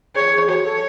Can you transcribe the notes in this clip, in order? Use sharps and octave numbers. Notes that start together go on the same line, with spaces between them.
G#4 C#5
G#4
F#4 C#5
A4